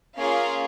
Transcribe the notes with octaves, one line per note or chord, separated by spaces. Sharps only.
A#3 C#4 F4 G#4 F5